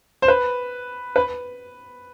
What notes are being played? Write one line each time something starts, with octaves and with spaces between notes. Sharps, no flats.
C5
B4
B4